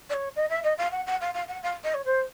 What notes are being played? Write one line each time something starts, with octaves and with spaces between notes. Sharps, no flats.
D5
C#5
D#5
E5
D#5
F5
F#5
F#5
F5
F5
F#5
F5
D#5
C#5
C5